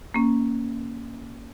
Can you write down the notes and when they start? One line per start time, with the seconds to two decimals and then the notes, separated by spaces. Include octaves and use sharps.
0.14 A#3 C#4